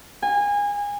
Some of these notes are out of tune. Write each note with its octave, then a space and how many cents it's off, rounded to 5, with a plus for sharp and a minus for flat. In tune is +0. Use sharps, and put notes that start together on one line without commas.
G#5 -25